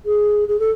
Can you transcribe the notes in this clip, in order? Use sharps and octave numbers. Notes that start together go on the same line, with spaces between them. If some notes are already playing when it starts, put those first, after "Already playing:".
G#4
G#4
A4